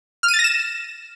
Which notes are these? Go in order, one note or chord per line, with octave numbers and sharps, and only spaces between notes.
F6
D#7
A6
A#6
E7